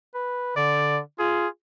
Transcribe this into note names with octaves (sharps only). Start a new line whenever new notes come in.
B4
D3 D5
F4 G#4